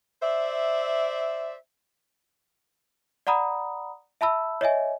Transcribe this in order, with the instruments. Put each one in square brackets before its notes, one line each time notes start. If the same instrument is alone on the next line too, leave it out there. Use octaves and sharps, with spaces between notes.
[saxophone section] C5 D5 E5
[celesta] D5 F#5 A#5 B5 D#6
E5 A5 B5 E6
C#5 D#5 E5 G#5